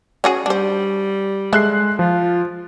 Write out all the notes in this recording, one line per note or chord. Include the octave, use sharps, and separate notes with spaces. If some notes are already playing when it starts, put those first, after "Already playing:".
C#4 F#4 G#4
G3 D4 C5
G#3 A4 E5 F#6 C7
F3 F4